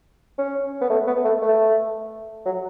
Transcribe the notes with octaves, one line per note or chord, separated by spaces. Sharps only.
C#4
B3
A3
B3
A3
A3
F#3